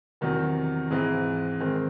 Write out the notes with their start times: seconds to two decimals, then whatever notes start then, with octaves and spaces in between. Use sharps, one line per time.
0.21 E2 C3 D#3 F#3
0.91 G#2 E3 G#3 C4
1.60 D#3 G#3 C4